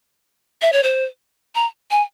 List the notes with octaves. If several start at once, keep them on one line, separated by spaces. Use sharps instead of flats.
E5
C#5
C5
A#5
G#5